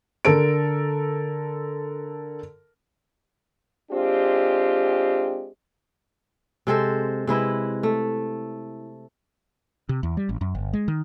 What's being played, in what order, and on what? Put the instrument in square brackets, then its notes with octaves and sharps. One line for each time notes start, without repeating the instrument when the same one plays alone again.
[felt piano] D3 A4 A#4 D7
[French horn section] G#3 C4 D4 F4 G4
[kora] C3 G#3 A4 C5
C3 G#3 E4 B4
A3
[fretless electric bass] C3
E2
G3
A1
F#2
G1
G#3
D#3